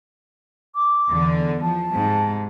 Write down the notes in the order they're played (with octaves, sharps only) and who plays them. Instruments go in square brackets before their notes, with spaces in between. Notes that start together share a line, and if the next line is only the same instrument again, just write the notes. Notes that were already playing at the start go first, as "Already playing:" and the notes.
[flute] D6
[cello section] E2 D3
[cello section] F3 [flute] A5
[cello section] G#2 C3